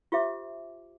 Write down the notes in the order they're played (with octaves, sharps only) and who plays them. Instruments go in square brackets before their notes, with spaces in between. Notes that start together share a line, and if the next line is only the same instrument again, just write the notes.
[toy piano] F4 G4 C5 E5 D6